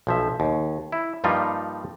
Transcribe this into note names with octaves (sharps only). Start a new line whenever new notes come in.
B1 F3 E5
D#2
E4
G2 F3 G3 A#3 D#4 F4